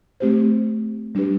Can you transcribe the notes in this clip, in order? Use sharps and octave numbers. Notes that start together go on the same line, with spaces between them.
A3 C4 G4 C5
G3 D4 G4 B4